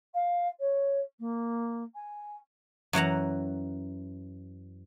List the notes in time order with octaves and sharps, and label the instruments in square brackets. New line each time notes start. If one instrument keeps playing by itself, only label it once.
[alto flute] F5
C#5
A#3
G#5
[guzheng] F#2 E3 F#5 A#5